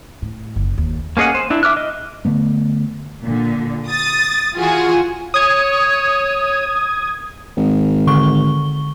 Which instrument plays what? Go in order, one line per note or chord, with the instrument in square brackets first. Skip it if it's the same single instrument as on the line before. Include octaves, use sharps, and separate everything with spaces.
[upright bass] A2
F#1
D#2
[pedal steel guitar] A#3 C#4 G#4 D#5 F#5
C5
D4 E4
E5 D6 F6 F#6
D#5
[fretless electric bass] D3 A3 B3
[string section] A#2 D3
D#6 A6
E3 F4 F#4 G#4
[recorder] C#5 [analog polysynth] D#6 G#6
[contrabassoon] G#1
[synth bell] D3 C#6 G7